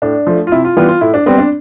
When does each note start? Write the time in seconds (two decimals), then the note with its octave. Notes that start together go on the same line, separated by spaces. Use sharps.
0.02 A2 D4
0.27 F3 A3
0.47 F4
0.52 C3 E4
0.65 F4
0.77 E3 G3 B3 F4
0.88 F4
1.01 A2 E4
1.14 D4
1.26 G3 B3 C4
1.38 D4